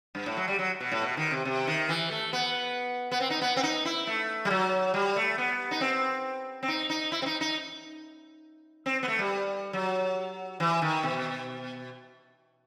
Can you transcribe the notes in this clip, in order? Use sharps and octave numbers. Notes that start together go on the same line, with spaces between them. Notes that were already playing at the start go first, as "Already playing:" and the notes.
G2
A2
F#3
G3
F#3
B2
A2
B2
D#3
C3
C3
D#3
E3
A3
B3
B3
C4
D#4
B3
C4
D#4
E4
A3
G3
F#3
G3
A3
B3
D#4
C4
C4
D#4
D#4
E4
C4
D#4
D#4
C4
B3
A3
G3
F#3
E3
D#3
B2